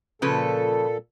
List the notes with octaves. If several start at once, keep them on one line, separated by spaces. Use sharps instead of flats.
A#2 C#3 F3 A4 B4